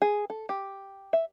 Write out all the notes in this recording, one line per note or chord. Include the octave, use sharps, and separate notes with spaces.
G#4
A4
G4
E5